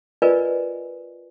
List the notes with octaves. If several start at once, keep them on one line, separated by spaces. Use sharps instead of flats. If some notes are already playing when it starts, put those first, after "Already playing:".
F4 A#4 B4 D5 D#5 G#5